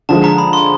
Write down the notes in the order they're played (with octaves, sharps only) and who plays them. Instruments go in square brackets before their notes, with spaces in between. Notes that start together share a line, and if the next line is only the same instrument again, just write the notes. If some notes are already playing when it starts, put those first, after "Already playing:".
[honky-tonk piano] D3 F3 G#3 [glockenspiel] A5
[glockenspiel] A#5
B5
C6